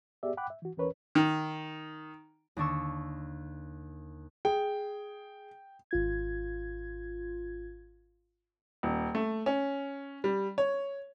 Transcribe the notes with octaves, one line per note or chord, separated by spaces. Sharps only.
B3 G4 G#4 D5 E5
F#5 G5 B5 D6 F#6
E5
E3 F#4
D#2 E3 C#4 A#4 B4 C#5
D#3
D#2 D3 D4 C#6 E6
G#4 G5
G#1 F4 G#6
D#1
A3
C#4
G3
C#5